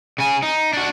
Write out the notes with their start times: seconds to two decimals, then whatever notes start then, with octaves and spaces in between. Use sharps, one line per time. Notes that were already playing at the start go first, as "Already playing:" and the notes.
0.18 C#3 G#5
0.42 D#4
0.73 D4 F#4